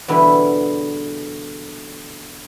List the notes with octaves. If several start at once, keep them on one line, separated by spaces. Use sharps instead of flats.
E2 B2 D3 G3 B3 E4